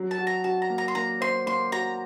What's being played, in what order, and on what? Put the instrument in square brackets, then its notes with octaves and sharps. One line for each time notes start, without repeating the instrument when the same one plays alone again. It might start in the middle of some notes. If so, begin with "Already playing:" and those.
Already playing: [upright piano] F#3
[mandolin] A5
[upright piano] F#4
[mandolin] A#5
[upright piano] F#4 [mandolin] A5
[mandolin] A#5
[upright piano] A#3
[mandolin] A#5
C6
[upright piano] A#3 [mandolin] A#5
[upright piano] C5 [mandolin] C6
[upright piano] A#3 [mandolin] C6
[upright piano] F#4 [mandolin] A#5